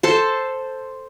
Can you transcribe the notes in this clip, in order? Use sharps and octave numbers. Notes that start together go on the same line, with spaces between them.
A4 C5 A5